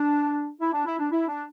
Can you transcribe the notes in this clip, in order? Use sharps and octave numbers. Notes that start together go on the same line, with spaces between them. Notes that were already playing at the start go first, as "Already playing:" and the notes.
Already playing: D4
E4
D4
E4
D4
E4
D4